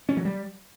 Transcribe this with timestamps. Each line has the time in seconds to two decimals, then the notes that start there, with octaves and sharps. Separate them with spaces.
0.09 C#4
0.17 F#3
0.25 G3